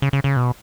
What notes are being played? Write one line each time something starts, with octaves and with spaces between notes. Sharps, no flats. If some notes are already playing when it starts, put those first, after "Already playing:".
C#3
C#3
C#3
B2